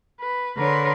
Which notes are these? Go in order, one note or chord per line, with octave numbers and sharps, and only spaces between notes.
B4
D3 A#4 B4 C#5 C6